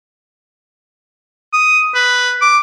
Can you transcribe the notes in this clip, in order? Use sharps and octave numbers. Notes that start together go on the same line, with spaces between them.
D#6
B4
D6